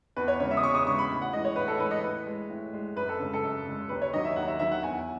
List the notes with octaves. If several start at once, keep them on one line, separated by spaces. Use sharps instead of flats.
E2 B4
C#5
C#3 G#3 C#5
E5
D#6
E2 C#6
D#6
C#3 G#3 C#6
B5
A2
F#5
E3 G#3 D#5
C#5
A2 B4
A4
E3 G#3 B4
D#5
A2 B4
G#3
A2
G#3
F#2 B4
A4
C#3 G#3
A4
F#2
C#3 G#3
D#2 B4
C#5
D#3 F#3 D#5
E5
D#2 F#5
E5
D#3 F#3 E5
F#5
E2 G#5